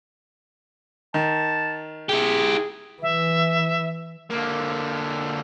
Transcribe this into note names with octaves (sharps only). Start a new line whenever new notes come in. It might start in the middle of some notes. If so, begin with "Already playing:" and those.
D#3 A5
E4 G4 G#4
E3 E5
D3 A#3